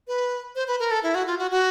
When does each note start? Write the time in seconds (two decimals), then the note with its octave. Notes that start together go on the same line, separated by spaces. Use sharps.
0.08 B4
0.55 C5
0.68 B4
0.80 A#4
0.91 A4
1.03 E4
1.15 F#4
1.26 F4
1.39 F#4
1.51 F#4